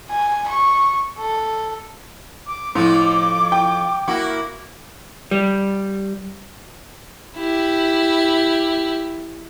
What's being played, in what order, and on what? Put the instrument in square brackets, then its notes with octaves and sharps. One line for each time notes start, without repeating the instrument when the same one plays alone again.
[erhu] G#5
C#6
A4
[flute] D6
[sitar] F2 F3 F4 [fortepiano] A2
[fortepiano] G5
[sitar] A#3 E4 F#4
[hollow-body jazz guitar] G3
[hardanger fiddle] E4 G4